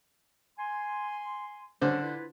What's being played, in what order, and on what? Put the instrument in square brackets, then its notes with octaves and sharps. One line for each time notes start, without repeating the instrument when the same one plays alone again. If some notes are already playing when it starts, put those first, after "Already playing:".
[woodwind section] G#5 C6
[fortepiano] D3 D4 C5 [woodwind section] G3 C#4
[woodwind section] E4 F4 B4